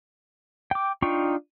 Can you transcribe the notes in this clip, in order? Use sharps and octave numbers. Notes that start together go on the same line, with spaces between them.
G5 D6
D4 D#4 F4 G5 C#6